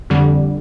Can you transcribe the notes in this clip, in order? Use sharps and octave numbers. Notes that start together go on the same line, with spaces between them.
F2 D3 G3